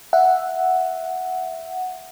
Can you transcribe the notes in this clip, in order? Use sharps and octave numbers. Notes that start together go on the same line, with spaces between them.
E5 F#5